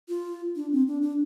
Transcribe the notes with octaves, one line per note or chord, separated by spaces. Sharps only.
F4
D4
C4
D4
D4